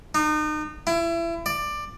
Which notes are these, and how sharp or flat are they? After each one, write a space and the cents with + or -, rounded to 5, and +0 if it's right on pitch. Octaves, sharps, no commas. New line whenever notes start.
D#4 -35
E4 +30
D5 +15